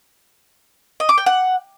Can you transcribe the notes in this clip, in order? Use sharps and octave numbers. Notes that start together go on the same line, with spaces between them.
D#5
D6
G5
F#5